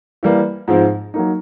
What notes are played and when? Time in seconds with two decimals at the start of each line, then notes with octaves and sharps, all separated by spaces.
0.23 E3 G3 A#3
0.68 G#2 F3 G#3 C4
1.14 F#3 A#3 D#4